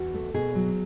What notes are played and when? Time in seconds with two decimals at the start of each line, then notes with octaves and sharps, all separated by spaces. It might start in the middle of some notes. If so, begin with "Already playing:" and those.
Already playing: E2 F#4
0.14 A3
0.34 B2 G#4
0.55 F#3